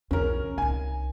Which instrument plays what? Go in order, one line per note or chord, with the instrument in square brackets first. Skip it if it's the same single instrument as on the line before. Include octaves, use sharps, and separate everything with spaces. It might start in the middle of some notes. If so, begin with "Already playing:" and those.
[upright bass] B1 E2 [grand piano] C#4 A#4
[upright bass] C2 D#4 [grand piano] G#5